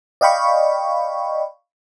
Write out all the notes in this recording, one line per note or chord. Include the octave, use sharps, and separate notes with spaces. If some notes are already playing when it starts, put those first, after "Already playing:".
D5 D#5 F5 G5 B5 C#6